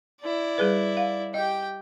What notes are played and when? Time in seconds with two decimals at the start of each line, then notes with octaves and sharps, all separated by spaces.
0.21 E4 D5
0.58 G3 G#4 B4
0.97 F5
1.34 G4 D#5 G5